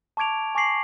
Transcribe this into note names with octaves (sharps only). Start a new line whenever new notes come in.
A5 C#6 D6 G#6 D7 F7
G#5 C#6 D6 A#6 C7 F#7